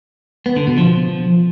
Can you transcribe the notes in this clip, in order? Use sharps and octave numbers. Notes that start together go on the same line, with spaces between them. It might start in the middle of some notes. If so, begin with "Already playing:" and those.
B3
D3
B2
F3